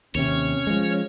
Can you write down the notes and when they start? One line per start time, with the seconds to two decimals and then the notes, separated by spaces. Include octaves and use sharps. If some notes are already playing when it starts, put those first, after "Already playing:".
0.15 D#2 C3 C#4 C#5
0.67 F3 G#3